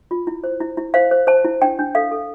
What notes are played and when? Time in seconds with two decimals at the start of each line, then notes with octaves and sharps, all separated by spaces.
0.11 F4
0.27 E4
0.44 C5
0.60 E4
0.77 E4
0.94 C5 F5
1.11 C5
1.27 C5 A5
1.44 E4
1.62 D4 G5
1.79 D4
1.95 A4 F5
2.12 A4